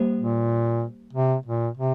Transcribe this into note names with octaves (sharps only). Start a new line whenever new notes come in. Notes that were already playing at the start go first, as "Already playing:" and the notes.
Already playing: G3 A#3 G4 C5
A#2
C3
A#2
C3